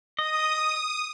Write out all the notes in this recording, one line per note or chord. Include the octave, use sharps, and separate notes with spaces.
D#5 D#6